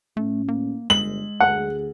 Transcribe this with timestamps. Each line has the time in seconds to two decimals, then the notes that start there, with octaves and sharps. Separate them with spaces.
0.17 A2 A3 C#4
0.48 A#3
0.90 G1 G#3 F#7
1.40 D2 G#4 F#5